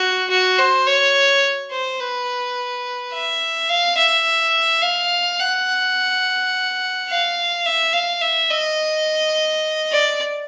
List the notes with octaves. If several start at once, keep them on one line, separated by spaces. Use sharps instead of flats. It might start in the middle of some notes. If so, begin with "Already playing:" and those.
Already playing: F#4
F#4
C5
C#5
C5
B4
E5
F5
E5
F5
F#5
F5
E5
F5
E5
D#5
D5